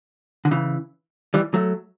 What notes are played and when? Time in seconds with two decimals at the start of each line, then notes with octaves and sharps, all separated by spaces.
0.45 D3
0.51 C#3 E3
1.34 E3 G3
1.54 F#3 A3